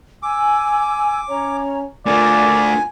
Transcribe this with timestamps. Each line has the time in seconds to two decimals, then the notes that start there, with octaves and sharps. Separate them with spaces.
0.23 G#5 D6 E6
1.28 C#4 C#5 A#5
2.06 A3 D4 F4 A#4 D5 F#5 G#5